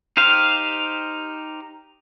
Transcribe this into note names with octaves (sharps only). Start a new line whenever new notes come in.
D#4 G4 C5 F5